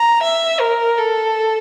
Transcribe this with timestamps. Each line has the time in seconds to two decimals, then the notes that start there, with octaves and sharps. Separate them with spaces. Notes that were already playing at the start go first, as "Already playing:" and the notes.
Already playing: A#5
0.23 E5
0.60 A#4
0.98 A4